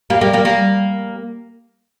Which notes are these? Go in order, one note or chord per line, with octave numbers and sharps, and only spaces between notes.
G3 A#3
G3 A#3
G3 A#3
G3 A#3